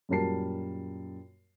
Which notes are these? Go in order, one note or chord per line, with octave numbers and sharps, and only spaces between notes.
F#2 A#2 G3 A#4 A5 C7